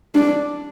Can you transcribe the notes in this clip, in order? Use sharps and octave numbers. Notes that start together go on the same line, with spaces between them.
D4